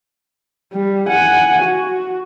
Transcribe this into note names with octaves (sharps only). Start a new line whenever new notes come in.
G3
F#5 G#5
F#4